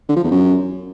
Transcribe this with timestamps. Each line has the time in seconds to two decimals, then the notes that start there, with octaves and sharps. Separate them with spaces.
0.09 D3
0.16 F3
0.24 E2
0.31 F#2